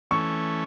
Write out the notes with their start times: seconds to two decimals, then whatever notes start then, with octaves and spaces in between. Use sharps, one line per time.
0.11 E3 A3 C#4 C#6